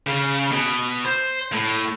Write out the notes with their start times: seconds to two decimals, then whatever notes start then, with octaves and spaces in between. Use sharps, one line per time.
0.07 C#3
0.52 B2
1.04 C5
1.52 A2